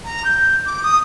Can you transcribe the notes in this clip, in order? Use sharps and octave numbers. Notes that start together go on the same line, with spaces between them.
A#5
G6
D6
D#6